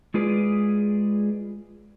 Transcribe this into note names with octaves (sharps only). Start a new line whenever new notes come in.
G#3 E4 F4 G#4 B4 D5